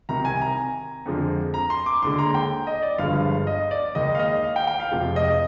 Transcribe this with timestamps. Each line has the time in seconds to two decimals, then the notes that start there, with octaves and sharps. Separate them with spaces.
0.09 C2 C3 D#3 A#5
0.25 G#5
0.41 A#5
1.06 F2 D3 F3 G#3
1.54 A#5
1.70 C6
1.86 D6
2.03 D#2 D3 G#3 C6
2.18 A#5
2.34 G5
2.67 D#5
2.83 D5
2.98 G1 G2 D3 F3 G#3 F5
3.47 D#5
3.71 D5
3.95 D#2 D#3 G#3 D#5
4.15 F5
4.19 D#5
4.44 F5
4.56 G5
4.67 G5
4.80 F5
4.91 F1 F2 C3 F3 G#3
5.16 D#5